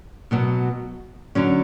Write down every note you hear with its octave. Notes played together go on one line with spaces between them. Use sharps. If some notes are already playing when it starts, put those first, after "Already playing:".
B2 F#3 B3
D3 F#3 C#4